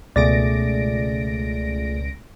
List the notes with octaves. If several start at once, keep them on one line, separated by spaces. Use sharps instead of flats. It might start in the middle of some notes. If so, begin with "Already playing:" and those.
C#2 B2 A3 G#4 D5 A6 A#6 D7